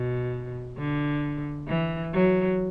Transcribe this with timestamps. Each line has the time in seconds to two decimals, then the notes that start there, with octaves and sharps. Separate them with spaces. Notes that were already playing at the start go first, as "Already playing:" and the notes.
Already playing: B2
0.78 D3
1.68 E3
2.14 F#3